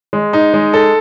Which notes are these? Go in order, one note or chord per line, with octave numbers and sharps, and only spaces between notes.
G#3
D#4
G#3
A4